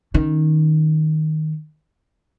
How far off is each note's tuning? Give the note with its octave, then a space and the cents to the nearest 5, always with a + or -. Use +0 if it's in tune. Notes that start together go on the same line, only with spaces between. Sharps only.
D#3 +0 C#4 +0